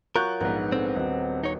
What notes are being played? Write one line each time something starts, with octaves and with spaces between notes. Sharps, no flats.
F#3 F4 A#4 C#6 F#6 G6
A#1 G#2 D#3 B3
D3 C4
D#1 F#4 D#5
D#4 C#5